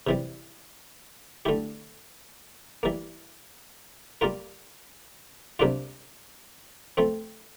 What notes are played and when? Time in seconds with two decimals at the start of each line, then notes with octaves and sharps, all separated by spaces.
0.07 C3 E3 G3
1.45 D3 A3 E4 G4
2.83 E3 G3 A#3
4.21 G3 A#3 F4 A#4
5.59 C3 G3 A#3 D4 F4
6.97 F3 A3 C4